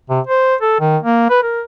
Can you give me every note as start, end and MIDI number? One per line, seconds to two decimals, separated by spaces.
0.09 0.20 48
0.27 0.55 72
0.61 0.77 69
0.80 0.98 51
1.02 1.28 58
1.30 1.42 71
1.43 1.62 70